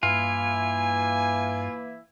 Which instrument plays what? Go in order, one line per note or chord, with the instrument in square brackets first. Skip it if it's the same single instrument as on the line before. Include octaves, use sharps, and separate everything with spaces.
[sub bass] G2 [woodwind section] E3 A#3 E4 [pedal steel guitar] F4 [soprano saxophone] G#5